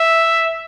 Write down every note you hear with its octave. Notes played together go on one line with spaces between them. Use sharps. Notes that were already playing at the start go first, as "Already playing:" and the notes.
Already playing: E5